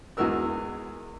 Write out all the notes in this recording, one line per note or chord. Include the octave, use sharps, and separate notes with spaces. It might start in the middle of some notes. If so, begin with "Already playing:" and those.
E2 E3 G#3 F#4 A#4 E6